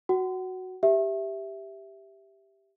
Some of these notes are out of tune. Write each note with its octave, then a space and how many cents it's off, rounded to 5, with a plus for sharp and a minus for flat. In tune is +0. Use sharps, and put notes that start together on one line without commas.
F#4 +0 F#5 +30
G4 +0 E5 +0